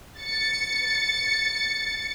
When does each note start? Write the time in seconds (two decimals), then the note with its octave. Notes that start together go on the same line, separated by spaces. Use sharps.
0.18 A6 C#7